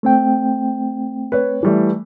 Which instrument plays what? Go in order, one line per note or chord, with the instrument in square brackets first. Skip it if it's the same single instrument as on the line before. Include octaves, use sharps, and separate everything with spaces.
[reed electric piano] A3 C4 G5
[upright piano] B4 C#5
E3 G3 A3